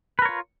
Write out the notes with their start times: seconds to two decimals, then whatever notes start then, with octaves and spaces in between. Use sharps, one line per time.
0.19 B4
0.22 A#4
0.25 C#5
0.29 F4